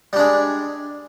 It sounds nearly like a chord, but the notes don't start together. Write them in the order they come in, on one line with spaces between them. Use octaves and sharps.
G3 D4 G#3